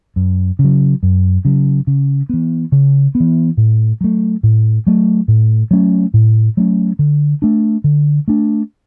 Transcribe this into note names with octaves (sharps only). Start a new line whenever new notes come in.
F#2
C#3
F#3
F#2
C#3 F#3
C#3
E3 B3
C#3
B3
E3
A2
F#3 A3
A2
F#3 A3
A2
F#3 A3 C#4
A2
F#3 A3 C#4
D3
A3 D4
D3
A3 D4